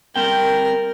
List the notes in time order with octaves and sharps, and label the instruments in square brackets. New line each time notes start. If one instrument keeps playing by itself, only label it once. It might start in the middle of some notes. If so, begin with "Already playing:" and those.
[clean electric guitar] G3 C4 G5 [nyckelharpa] A#4